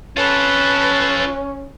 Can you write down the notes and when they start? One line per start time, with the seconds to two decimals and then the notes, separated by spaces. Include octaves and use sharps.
0.17 C#4 F4 A4 B4